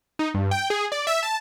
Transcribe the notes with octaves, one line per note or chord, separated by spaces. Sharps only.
D#4
G2
G5
G#4
D5
E5
A5